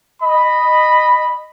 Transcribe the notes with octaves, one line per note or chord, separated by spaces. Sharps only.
D#5 B5